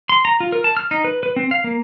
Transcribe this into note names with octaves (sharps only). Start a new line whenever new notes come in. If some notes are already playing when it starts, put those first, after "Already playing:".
C6
A#5
F4
A#4
A5
F6
D#4
B4
B4
C4
F5
A#3